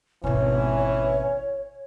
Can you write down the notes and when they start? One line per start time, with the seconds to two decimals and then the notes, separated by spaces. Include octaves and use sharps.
0.24 G#1 B2 E3 C#4 C#5